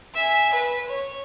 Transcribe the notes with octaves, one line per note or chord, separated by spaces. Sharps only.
E5 G#5
B4
C#5